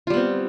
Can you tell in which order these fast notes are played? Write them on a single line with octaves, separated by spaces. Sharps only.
F4 G3 B3 C4